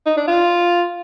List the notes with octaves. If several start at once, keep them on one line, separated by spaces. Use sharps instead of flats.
D#4
D4
F4